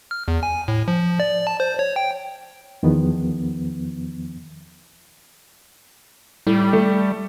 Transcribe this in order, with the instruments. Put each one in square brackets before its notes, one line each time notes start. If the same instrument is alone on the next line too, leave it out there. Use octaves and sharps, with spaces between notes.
[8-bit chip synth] F6
E2
G#5
A2
F3
D5
A5
C5
C#5
G5
[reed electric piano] E2 D#3 F3 B3
[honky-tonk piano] A2 [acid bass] G3
[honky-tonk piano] A3